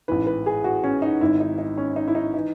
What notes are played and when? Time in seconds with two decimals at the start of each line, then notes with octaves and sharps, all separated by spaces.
0.08 A1 G#2 E3 B4
0.27 B4
0.46 G#4
0.64 F#4
0.84 C#4
1.02 D#4
1.21 G#1 G#2 D#3 E4
1.40 D#4
1.58 D#4
1.78 C#4
1.96 D#4
2.08 E4
2.15 D#4
2.34 E3 D#4